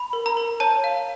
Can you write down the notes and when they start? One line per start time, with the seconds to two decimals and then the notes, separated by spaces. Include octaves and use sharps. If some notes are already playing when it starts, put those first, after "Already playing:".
Already playing: B5
0.13 A#4
0.26 A#5
0.37 A#4
0.60 C#5 A5
0.84 F5